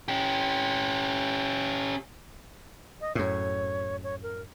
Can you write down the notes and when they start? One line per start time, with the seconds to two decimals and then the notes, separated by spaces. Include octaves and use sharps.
0.08 C#4 G4
3.01 D#5
3.15 F#2 A2 C#5
4.04 C#5
4.23 A#4